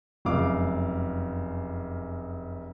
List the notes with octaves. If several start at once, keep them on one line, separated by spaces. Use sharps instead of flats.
F1 F#2 C#3 F5 D6